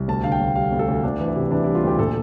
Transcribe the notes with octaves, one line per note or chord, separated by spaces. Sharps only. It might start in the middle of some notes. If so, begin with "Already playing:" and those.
Already playing: C2
D2 A5
D3 F5
G5
D2
G3 F5
D2
A4
D2
D2 D4
E3
E4
C3
E3 D4
G3 E4
F4
D2 G4
A#2 A4